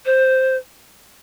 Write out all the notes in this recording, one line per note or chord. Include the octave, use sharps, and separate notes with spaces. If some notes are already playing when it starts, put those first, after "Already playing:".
C5